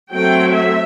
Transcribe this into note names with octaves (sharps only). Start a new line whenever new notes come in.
F#3 A3 C4 G5
E5